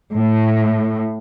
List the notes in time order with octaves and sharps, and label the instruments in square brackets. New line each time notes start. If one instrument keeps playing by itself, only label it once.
[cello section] A2